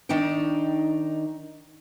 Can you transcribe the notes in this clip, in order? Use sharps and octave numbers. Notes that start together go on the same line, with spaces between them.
D#3 D4 D#4 G5